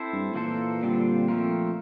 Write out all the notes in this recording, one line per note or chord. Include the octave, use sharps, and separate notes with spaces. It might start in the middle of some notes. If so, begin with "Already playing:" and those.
Already playing: C4 E4 A4 C5
G2
A2
A#2 E3 A#3 F4 A4 C5
D3 G3 C4 F4
F3 A3 C4 F4 A#4